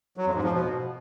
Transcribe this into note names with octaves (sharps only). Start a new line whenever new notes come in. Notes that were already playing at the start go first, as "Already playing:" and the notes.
F#3
F2
G#2
F3
B2